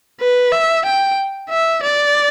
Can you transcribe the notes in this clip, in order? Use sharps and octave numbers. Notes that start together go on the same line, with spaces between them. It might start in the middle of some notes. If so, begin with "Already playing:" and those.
B4
E5
G5
E5
D5